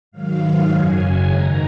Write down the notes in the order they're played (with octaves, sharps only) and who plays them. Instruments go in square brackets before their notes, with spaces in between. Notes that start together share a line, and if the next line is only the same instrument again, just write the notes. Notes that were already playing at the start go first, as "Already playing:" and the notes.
[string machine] G#2 D#3 F#3 F5
F#2 C#3 F#3 G#5
G#2 D#3 G#3 A#5